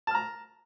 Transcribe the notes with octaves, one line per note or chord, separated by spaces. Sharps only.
A5 A#5 F6